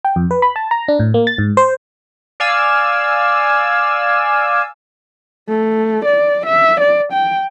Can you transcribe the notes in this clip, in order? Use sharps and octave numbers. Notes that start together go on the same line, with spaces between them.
G5
F2
B4
B5
A5
A#5
D4
A2
A#3
A6
G#2
C5
D5 F5 G#5 E6
A3
D5
E5
D5
G5